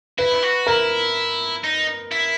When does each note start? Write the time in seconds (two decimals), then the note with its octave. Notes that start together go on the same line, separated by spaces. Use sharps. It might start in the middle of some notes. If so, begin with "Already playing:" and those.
0.19 E4 B4
0.43 F#4
0.67 E4 A#4
1.64 D#4
2.12 E4